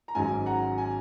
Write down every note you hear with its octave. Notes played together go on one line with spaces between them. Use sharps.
A#5
G#1 G#2 F#3 C#4 G#5
F#5 A#5
G#5